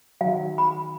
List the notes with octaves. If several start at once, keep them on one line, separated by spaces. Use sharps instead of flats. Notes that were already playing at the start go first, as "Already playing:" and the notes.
D#3 F#3 F5
B5